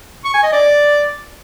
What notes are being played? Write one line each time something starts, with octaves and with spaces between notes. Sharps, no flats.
C#6
G#5
D#5
D5